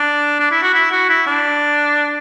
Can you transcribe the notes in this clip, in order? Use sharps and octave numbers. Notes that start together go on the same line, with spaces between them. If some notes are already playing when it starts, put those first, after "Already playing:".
Already playing: D4
D4
E4
F#4
E4
F#4
E4
D4